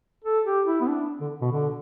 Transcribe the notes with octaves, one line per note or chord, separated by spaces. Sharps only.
A4
G4
E4
B3
D4
D3
B2
D3